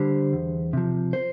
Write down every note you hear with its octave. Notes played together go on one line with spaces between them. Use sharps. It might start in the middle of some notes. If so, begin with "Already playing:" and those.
Already playing: D3 G3 C5
E2
C3 F3
C5